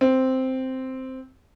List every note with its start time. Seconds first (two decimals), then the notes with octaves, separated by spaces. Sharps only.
0.01 C4